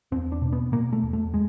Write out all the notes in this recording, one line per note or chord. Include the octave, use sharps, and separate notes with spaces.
E2 C4
D4
B2
B3
B2 A#3
A3
E2
A3
G#3